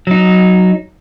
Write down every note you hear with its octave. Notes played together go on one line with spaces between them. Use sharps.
F#3 D#4